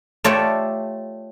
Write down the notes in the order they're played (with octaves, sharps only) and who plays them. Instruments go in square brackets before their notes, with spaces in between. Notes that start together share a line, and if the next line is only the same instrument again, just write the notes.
[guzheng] A3 F4 G4 C#5 D5 E5